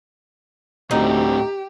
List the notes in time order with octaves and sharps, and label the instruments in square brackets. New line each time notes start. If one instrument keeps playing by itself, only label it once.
[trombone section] D2 [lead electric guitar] A2 C4 [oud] D#4 [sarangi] G4